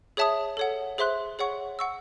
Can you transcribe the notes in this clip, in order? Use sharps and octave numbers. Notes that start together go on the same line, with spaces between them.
G#4 C#5 E5 A5 D#6
A4 C#5 F#5
G#4 C5 E5 C6 F#6
G#4 C#5 F#5 C#6
F#5 C#6 E6